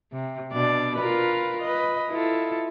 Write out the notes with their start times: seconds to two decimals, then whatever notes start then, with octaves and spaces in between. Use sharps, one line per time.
0.12 C3
0.52 B2 D4 D5
0.96 F4 A#4 B4
1.62 B4 D#5
2.10 E4 F4 A4